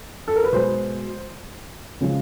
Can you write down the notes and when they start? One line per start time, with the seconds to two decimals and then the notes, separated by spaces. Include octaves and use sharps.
0.28 A4
0.36 A#4
0.44 B4
0.52 B2 G#3 C5
2.01 C#3 F3 G#3